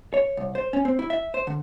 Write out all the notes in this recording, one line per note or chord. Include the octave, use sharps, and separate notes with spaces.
C#5
C2
C5
C#4
C4
E4
E5
C5
D3